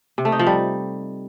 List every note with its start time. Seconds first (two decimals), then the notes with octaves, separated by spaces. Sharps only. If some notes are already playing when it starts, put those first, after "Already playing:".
0.18 C3
0.25 A3
0.32 D#4
0.39 F3
0.47 G3